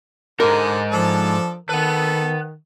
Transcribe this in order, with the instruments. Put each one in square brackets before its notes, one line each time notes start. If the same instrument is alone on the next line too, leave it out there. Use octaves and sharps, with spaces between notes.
[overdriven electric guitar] G#2 D#4 [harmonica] D3 [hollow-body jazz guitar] A#4
[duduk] F3 [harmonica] D4 A4
[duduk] D#3 [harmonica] A4 [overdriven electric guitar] B4 F#5